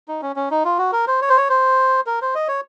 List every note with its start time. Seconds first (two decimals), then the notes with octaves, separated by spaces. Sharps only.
0.08 D#4
0.22 C#4
0.36 C#4
0.51 D#4
0.65 F4
0.78 F#4
0.92 A#4
1.07 C5
1.21 C#5
1.29 C5
1.37 C#5
1.49 C5
2.07 A#4
2.22 C5
2.35 D#5
2.48 C#5